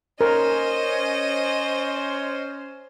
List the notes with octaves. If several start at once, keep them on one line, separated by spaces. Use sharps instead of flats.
C#4 A#4 C5 D#5